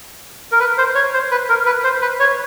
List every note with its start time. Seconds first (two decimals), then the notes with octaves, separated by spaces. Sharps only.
0.52 A#4
0.60 B4
0.78 C5
0.95 C#5
1.13 C5
1.31 B4
1.49 A#4
1.66 B4
1.84 C5
2.02 B4
2.20 C#5